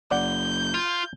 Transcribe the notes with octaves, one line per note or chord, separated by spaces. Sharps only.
F#1 D5 F#5 G6
F4